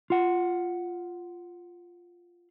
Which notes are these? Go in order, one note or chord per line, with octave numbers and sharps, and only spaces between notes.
F4 F#5